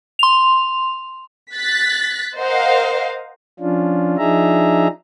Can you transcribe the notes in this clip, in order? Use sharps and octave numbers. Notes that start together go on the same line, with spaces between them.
C6 F7
F#6 A6 B6
A#4 C5 D#5 F5 F#5
F3 C#4 D4 F4
F3 D4 D#4 G#4 E5 A#5